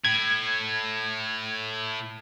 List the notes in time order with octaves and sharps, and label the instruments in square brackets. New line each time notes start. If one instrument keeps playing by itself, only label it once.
[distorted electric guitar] A2 [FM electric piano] G#6